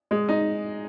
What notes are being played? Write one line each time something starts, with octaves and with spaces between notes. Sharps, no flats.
G#3
D#4